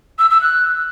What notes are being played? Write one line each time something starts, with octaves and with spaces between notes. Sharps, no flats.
E6
E6
F#6